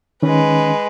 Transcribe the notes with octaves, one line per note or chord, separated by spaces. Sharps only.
D#3 G#3 C#4 B4